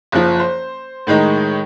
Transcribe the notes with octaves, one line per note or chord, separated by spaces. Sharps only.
F#1 F3
C5
A2 D#3 G#3 D#4